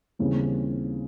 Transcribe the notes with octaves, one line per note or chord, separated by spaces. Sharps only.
D#2 C#3 E3 G3 C4